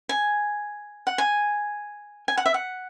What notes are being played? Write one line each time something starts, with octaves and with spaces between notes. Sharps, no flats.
G#5
F#5
G#5
G#5
F#5
E5
F#5